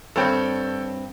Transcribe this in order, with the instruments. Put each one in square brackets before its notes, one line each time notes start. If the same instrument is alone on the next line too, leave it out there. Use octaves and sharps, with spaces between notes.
[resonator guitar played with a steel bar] G2 C4 [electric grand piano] A4 C#5 G5